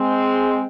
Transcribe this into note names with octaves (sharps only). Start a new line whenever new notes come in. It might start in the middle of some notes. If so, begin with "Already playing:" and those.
Already playing: G#3 C4